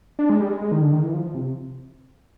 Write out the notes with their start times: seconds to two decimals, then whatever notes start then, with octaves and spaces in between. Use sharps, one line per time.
0.19 D4
0.30 G#3
0.41 G3
0.50 G#3
0.62 G#3
0.72 D#3
0.82 D3
0.93 D#3
1.03 E3
1.13 F3
1.24 F3
1.35 C3